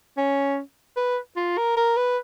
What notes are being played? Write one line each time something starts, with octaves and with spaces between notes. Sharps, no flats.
C#4
B4
F4
A#4
A#4
B4